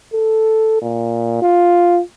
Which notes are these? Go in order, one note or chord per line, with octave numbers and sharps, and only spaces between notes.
A4
A#2
F4